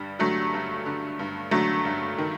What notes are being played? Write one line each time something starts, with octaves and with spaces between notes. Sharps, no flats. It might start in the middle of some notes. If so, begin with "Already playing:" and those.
Already playing: G2 D3 G3
D3 F#3 A3
G2
D3
G2
D3 F#3 A3
G2
D#3